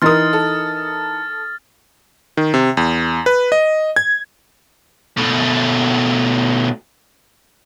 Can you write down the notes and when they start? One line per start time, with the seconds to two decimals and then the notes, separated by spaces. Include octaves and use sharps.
0.02 E3 D#4 A#4 C6 D#6 F6 A6
0.33 A4
2.37 D#3
2.54 C3
2.77 E2
3.26 B4
3.52 D#5
3.96 G#6
5.17 B2 A3